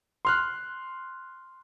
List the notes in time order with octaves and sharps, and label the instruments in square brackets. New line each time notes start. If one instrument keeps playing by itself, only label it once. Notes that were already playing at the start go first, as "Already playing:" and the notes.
[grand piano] C6 F6 F#6